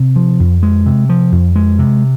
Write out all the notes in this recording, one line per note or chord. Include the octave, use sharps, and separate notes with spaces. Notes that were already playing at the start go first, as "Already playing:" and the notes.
Already playing: C3
F3
F2
G#3
C3
F3
F2
G#3
C3